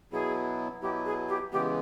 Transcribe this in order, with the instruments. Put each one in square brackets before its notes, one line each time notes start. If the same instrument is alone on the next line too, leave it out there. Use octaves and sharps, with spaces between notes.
[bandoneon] B2 F#3 B3 E4 [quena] G#4
[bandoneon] B2 F#3 B3 E4 [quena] G4
[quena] G#4
G4
[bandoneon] C#3 E3 G#3 B3 [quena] G4